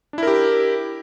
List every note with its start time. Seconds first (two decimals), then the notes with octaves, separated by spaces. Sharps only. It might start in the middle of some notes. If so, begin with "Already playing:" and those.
0.13 D4
0.18 E4
0.23 A#4
0.27 G4